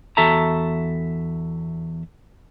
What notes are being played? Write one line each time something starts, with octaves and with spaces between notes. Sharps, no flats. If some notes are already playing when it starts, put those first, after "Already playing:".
E2 F#4 A4 E5 A5 A#5